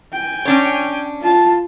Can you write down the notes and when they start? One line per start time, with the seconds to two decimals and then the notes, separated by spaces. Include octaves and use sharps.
0.13 G5 G#5
0.45 C#4 D4 C#5
1.21 F4 A5